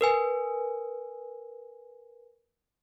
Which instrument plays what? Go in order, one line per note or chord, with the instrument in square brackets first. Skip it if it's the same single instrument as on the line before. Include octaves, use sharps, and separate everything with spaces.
[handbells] A#4 B4 G#5